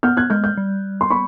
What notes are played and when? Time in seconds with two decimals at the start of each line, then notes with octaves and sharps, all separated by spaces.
0.03 B3 F6 G6
0.17 F#6 G#6
0.30 G#3 F6 G6
0.43 F6 G6
0.57 G3
1.01 C6
1.10 B5 C#6